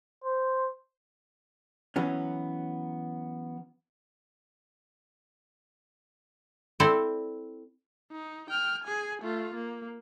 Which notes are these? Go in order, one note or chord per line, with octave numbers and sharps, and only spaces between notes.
C5
E3 F#3 B3 C#4
C4 E4 A4 C5 D5
D#4
G5 F6
G#4 G#5
A3 F4
A#3